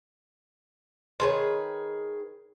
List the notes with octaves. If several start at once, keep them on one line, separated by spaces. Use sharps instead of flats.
D#3 G#4 B4 C#5 C6